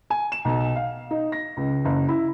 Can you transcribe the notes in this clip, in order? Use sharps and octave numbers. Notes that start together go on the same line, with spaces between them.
G#5
E7
B1
F5
D#4
A#6
C#2
F#1
E4